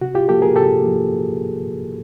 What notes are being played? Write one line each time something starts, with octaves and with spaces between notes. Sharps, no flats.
C3 F#4
F4 G4
F3 A#3 G4 A4
G#4 A#4
C3 G4 A4
F3 A#3